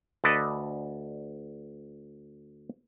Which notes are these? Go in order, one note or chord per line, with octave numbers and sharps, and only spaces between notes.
D2 A4 B4 D5 D#5